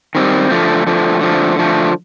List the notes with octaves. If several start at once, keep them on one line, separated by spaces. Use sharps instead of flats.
D#3 G3 C4
D3 F3 A3
D3 F3 A3
D3 F3 A3
D3 F3 A3